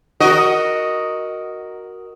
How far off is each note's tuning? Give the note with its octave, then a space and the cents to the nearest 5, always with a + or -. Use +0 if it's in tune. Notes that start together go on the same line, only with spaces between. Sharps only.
F#4 +0 A#4 +0 D#5 +0